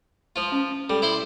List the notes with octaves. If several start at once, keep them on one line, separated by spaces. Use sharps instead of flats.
F3 F4
C#4
G3 A4 G5
E4 C5 C6